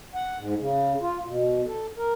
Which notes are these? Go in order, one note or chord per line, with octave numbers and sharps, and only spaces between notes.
F#5
G#2
C#3
F4
B2
A4
A#4